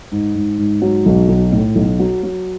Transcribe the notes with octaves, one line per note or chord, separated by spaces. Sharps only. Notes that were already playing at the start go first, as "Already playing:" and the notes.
G#2
G#2
G#2
F#3
B1
B1
A2
B1
F#3
F#3